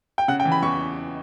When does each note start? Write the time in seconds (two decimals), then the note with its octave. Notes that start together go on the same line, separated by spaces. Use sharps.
0.18 G5
0.28 C#3 F#5
0.40 G5
0.45 E3
0.52 B5
0.63 E2 C#6